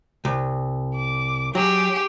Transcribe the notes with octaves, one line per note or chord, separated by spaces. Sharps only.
C2
D6
F#3 G4 G#4